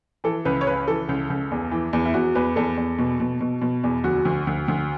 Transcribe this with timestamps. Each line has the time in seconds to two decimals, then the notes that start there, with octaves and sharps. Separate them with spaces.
0.24 E3 A4
0.45 C#2 B4
0.61 C#5
0.67 C#3 B4
0.88 E3 A4
1.09 C#2
1.30 C#2
1.51 E2
1.71 E3
1.93 E2
2.05 E4
2.14 E2 F#4
2.35 E2 B4
2.56 E2 A4
2.77 E2
2.99 B2
3.20 B2
3.40 B2
3.62 B2
3.84 E2
4.04 D2 F#4
4.25 D2
4.47 D2
4.68 D2